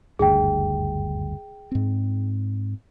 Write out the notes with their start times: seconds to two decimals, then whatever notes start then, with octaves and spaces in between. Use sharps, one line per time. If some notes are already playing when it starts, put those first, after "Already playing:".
0.19 F#1 D2 G2 G#4 G5
1.72 G#2 C4